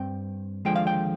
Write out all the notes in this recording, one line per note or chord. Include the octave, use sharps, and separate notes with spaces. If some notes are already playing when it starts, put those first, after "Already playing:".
Already playing: G2 C4 G5
D#2 D3 F3 G#3 G5
F5
G5